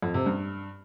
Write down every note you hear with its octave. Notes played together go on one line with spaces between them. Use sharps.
F2
C3
G2